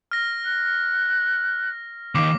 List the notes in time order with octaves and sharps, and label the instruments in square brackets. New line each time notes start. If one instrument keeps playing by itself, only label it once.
[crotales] F6 A#6
[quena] F#6
[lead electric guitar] D#2 D#3 [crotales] D6